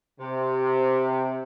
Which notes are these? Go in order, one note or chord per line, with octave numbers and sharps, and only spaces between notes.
C3